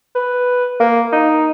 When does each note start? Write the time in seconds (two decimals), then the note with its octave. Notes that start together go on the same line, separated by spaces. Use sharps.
0.15 B4
0.80 A#3
1.12 D#4